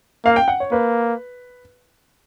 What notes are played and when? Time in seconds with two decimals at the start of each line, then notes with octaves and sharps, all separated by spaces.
0.25 A#3 F5
0.36 G5
0.48 F#5
0.60 C#5
0.72 A#3 B4